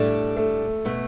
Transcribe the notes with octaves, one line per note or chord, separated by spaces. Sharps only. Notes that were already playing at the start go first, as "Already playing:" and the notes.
Already playing: A2 G3 A3 D4
A3
B2 A3